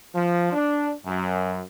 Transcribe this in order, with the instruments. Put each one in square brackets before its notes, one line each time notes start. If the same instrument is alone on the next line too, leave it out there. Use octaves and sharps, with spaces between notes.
[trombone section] F3
D4
F#2